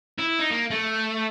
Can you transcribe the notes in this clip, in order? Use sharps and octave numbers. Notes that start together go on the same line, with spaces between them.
E4
D#4
A#3
A3